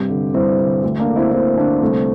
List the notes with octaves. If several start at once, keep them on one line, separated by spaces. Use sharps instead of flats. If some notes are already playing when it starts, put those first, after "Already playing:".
Already playing: G2 C3 G4
D3
G2 C4 E4
D3
D2
A#3 D4
D3
C4 E4
D2 C4 E4
D3 A#3 D4
C2 A3 C4